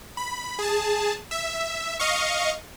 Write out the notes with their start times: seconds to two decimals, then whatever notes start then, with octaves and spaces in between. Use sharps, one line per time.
0.17 B5
0.59 G#4 A5
1.31 E5
1.99 D#5 F5 C#6